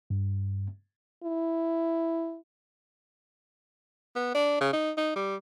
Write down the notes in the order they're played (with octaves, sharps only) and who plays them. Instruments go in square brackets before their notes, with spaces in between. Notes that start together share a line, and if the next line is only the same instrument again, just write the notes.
[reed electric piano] G2
[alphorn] E4
[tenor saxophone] B3
D4
C#3
D#4
D#4
G3